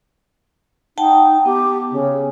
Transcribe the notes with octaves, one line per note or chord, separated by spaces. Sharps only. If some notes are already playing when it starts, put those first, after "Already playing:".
D#4 F#5 G5 A5
B3 G4
C#3